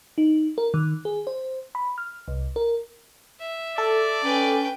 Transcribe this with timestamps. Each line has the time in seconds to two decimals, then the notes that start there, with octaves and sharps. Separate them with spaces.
0.18 D#4
0.58 A#4
0.74 D#3
1.05 G#4
1.27 C5
1.75 B5
1.98 F6
2.28 C2
2.56 A#4
3.40 E5
3.78 A4 D5
4.23 C#4 B4 G5